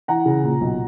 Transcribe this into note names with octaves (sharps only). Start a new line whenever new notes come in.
E3 F#5 A#5
C#3
A#2
B1